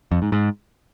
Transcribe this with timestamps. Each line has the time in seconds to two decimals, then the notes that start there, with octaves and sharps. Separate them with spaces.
0.12 F2
0.22 G#2
0.32 G#2